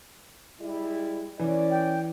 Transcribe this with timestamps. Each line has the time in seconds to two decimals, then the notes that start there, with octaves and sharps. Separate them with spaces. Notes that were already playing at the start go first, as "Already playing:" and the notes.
0.59 G3 G#3 E4
1.39 E3 C#4 D5
1.70 G5